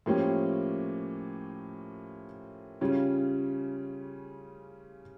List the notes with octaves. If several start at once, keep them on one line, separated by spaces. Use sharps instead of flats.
A2 F3 A#3 C#4 G4
C#3 G3 C#4 F4